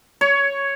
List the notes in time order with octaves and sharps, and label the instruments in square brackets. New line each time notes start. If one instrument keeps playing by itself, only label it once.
[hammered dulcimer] C#5